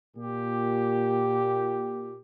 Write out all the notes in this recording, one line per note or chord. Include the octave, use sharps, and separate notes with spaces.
A#2 G4